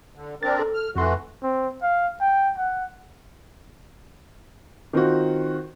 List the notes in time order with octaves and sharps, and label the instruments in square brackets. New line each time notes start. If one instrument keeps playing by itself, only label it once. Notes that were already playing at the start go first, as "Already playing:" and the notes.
[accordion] D3
[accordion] C4 D4 A#4 [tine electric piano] A6
[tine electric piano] A4
[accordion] F6
[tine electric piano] F2 C6 [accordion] E3 A3 F#4
[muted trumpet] C4
F5
G5
F#5
[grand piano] D#3 C4 F4 F#4